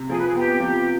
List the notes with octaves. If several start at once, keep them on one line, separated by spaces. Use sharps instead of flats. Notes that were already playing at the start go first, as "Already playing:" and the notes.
Already playing: C3
F3 G#4
B4
G#4
B3 G4
F3